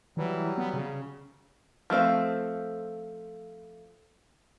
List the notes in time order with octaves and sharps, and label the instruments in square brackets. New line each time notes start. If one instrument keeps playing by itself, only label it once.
[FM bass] E3 [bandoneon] F#3 G3
[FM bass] B3
C#3
[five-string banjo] F3 A3 C4 F5